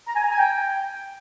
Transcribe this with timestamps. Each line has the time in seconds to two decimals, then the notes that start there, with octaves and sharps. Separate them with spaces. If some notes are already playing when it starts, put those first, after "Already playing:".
0.07 A#5
0.15 G#5
0.23 A#5
0.30 G#5
0.38 G5